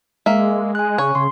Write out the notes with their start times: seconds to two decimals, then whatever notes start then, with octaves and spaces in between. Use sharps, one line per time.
0.26 G#3 A#3 E5
0.75 G#5 F#6
0.98 C#3 C#5
1.15 C#3 C6